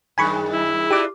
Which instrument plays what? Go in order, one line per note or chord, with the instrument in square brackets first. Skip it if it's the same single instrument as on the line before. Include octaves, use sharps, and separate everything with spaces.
[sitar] F#2 D#3 G#3 [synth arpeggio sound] G#5 B5 C#6
[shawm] E4
[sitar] D4 F4 [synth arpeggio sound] G4 D6